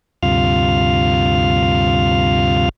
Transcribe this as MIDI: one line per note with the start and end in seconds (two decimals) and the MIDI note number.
0.23 2.69 38
0.23 2.69 43
0.23 2.69 48
0.23 2.69 65
0.23 2.69 77
0.23 2.69 89